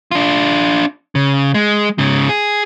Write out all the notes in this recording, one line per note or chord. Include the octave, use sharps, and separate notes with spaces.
D4 F4
C#3
G#3
G#2 C#3
G#4